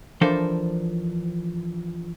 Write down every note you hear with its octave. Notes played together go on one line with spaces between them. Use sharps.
E3 F3 D4 A4 A#4 C5